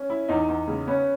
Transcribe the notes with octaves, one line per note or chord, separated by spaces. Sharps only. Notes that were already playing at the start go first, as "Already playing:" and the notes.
Already playing: C#4
E4
E2 D#4
E2
C#3
B3 C#4